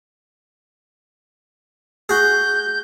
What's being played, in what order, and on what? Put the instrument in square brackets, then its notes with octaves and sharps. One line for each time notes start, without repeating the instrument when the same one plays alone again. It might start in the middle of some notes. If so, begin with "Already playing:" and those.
[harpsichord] F#4 G#4 [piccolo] G6